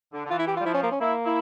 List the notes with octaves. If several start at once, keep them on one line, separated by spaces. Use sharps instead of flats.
D3
D3
E3 F4
E4
G4
G3 F4
F3 E4
C#4
A#3
C#4
A#3 E4
E4